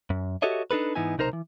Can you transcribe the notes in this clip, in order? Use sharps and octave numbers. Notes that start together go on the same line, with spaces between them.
F#2
F#4 G4 A4 C#5 D#5 E5
D4 D#4 A4 B4
G#2 E3 B3 D#4 E4 G#5
B1 C3 D#4 A#4 C5 A#5
E3